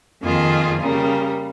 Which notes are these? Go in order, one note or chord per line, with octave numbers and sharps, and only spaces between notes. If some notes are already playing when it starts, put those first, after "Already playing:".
F2 D#3 A#3 F4 G#4
C#3 G3 A#3